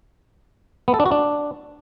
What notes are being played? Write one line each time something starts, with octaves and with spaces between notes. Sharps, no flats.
B3
A4
D4
F#4
D4